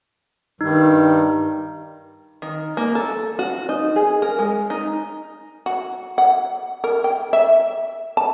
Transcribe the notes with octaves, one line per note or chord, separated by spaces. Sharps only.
G2 D#3 G3 D#4
D#3
A#3
A4
F#4
D#4
G#4
A#4
G#3
D#4
F#4
F#5
A#4
G5
E5
A5